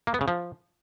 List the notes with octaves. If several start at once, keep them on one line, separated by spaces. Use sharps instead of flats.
A#3
B3
C#3
F3